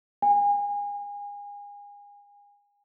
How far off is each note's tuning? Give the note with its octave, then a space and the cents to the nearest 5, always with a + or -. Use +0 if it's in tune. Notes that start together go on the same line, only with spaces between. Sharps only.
G#5 -30